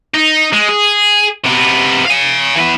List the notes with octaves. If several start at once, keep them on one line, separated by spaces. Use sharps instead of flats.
D#4
G#3
G#4
C3 B3
F5 G#5
E3 B3